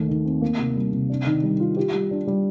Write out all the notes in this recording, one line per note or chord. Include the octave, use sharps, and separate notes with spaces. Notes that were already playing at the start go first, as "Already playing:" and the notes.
Already playing: D#2 A3
D#3
C4
A#3
C3
G3
C3
D4
D#3
G3
F4
G4
G3
D4
G3